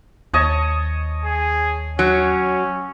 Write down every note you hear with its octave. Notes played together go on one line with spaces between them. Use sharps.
D#2 C#5 D#5 A5
G#4
F#3 C#4